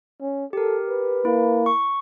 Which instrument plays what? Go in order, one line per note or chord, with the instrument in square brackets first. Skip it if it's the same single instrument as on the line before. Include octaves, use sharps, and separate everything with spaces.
[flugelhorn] C#4
[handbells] G4 A#4 [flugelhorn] A4
[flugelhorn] B4
[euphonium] A#3 [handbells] E4
[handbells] C#6